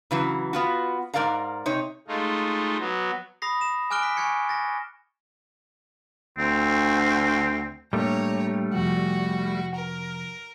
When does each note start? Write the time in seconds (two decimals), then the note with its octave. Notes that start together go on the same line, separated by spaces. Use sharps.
0.11 C#3 E3 F#3
0.53 B3 F4 F#4
1.14 G#2 G3 A#4 D5 F5 A#5
1.66 C3 D#4 C#5
2.08 G#3 A3 D#4 F4
2.79 F#3 B3
3.42 B5 D#6 A#6 C7
3.61 E7
3.90 G#5 D6 F6 F#6 D7 G7
4.03 B6
4.17 G#5 C#6 F#6 G#6 C#7
4.49 A6 A#6
6.38 D2 C4
7.93 A2 G3 A3 A#3 D4 C#5 A#5
8.74 F2 C3 F3 F#4
9.75 A#4